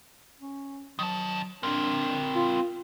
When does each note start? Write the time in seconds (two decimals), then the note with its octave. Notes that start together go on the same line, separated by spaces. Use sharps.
0.40 C#4
0.99 D#3 F#3 A5
1.63 C4 D4 A#4
2.35 F4